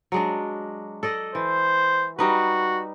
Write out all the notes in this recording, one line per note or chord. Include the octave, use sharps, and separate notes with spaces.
F#3 G#3 D4
A4 D5 D#5
E3 C5
G3 D#4 F#4 B4